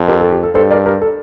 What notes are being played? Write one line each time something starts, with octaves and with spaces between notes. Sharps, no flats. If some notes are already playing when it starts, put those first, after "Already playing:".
Already playing: F2
G4 A#4
A4
G4
A4
G2 A4 C5
A#4 D5
G4 A#4
A4